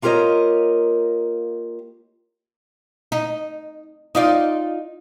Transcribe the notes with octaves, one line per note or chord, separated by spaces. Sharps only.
A#3 F4 G4 A#4 C#5 D#5
D#4
D#4 F4 D5